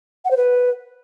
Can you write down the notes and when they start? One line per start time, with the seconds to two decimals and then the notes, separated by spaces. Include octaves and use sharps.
0.25 F#5
0.31 C5
0.36 B4